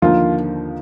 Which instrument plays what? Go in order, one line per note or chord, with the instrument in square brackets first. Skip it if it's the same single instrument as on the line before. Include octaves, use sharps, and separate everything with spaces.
[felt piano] D#2 D3 F3 A#3 D#4 [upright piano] F4